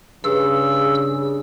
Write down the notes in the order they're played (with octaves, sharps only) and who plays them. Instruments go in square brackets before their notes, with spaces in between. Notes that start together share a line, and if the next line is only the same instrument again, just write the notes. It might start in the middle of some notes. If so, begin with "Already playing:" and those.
[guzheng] G2 [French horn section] C#3 [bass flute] G#4 [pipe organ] E6